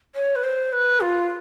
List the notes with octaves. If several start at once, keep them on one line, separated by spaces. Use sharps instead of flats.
C#5
B4
C5
B4
F4